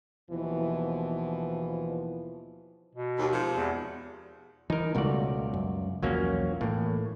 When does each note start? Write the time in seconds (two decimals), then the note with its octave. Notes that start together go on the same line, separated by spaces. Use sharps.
0.31 D#2 B2 E3 F3
2.95 B2
3.18 D#2
3.32 G#2 C3 F3
3.56 E2
4.70 E3 D#4 A#4
4.95 C#2 B2 G3 A3 F#4 D5
5.54 F#2
6.03 B1 E2 F3 F#3 A#3 C#4
6.61 A2 E3 A#3